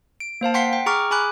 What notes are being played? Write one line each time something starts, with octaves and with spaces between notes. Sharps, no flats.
D7
A#3 C5 F5 A5
F#5 G5 C6 B6 C7
G5
G#4 A#5 C#6 D6 F6
G#4 G#5 B5 D6 F#6